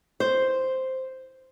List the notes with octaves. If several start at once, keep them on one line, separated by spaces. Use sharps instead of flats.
C5